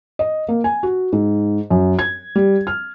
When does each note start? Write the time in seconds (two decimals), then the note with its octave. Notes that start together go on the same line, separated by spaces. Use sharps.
0.19 D#5
0.48 A#3
0.64 G#5
0.83 F#4
1.12 G#2
1.70 F#2
1.99 G#6
2.36 G3
2.67 F6